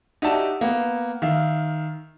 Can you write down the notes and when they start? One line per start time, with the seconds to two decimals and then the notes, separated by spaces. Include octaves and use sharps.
0.22 D#4 F#4 G4 D5 E5 A5
0.61 A#3 B3
1.22 D#3 E5 F5